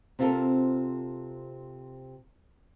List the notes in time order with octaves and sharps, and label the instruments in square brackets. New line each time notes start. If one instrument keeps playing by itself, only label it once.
[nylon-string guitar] C3 C4 F4 G4 A4 A#4